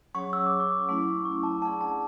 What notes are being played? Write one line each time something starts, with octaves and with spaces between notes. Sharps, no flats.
F#3 C#4 G#4 C#5 F#5 C#6
E6
D6
C#6
D6
F#3 A3 C#4 E4
C#6
A5
D4 G#4 D5 F#5 A5
A5